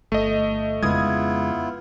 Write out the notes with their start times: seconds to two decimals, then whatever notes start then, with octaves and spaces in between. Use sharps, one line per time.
0.12 G1 A3 D#5
0.83 F2 C#3 G#3 B3 E4 F4 D#6 G#6